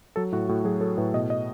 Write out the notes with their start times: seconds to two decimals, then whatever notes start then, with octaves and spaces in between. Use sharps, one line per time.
0.16 F#3 A4
0.32 A2 F#4
0.48 A2 F#4
0.64 F#3 G#4
0.81 F#3 A4
0.97 A2 B4
1.14 B2 D#5
1.30 D#5